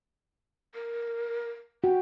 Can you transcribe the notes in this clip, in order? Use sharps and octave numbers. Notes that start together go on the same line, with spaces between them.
A#4
F#4 G5